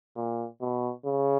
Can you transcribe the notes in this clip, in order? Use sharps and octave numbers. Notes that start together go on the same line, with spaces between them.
A#2
B2
C#3